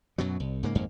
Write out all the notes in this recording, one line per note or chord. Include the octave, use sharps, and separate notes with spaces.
F#2 B2 F#3
C2
G#2 C#3 A#3
G#1 F2 G#2 A#3